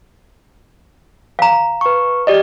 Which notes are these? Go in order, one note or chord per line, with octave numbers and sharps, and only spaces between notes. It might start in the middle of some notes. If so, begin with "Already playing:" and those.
F5 A#5
B4 C#6
G4 D5 D#5